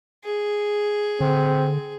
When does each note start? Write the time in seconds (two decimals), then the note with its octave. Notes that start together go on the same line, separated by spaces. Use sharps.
0.24 G#4
1.21 D3 C4